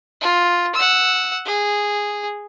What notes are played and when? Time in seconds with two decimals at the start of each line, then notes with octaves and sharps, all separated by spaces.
0.21 F4
0.75 F#5 E6
1.46 G#4